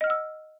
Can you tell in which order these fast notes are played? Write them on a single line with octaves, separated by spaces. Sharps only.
D#5 F6 F#5 E6